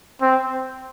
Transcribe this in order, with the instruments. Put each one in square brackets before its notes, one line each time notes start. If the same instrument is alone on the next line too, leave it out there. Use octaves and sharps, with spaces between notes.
[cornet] C4